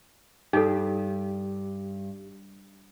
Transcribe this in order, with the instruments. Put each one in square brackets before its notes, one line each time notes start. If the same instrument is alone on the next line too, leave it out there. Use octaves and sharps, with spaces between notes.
[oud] G2 [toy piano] D#4 A4 [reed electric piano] G4